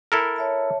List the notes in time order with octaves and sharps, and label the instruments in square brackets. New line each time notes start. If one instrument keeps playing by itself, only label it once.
[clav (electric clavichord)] E4 A4 A#4
[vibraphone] C#5 E5 A5